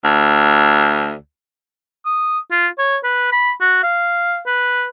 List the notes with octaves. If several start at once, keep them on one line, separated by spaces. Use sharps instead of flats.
D2
D#6
F4
C#5
B4
B5
F#4
F5
B4